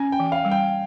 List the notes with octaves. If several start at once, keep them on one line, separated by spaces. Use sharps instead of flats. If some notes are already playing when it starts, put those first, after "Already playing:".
Already playing: C#4 G#5
G5
E3
F5
G3
G5